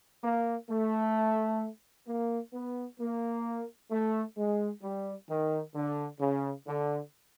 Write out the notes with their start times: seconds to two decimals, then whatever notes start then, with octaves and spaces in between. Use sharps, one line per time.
0.23 A#3
0.70 A3
2.07 A#3
2.53 B3
3.00 A#3
3.91 A3
4.37 G#3
4.82 G3
5.28 D#3
5.74 D3
6.20 C#3
6.67 D3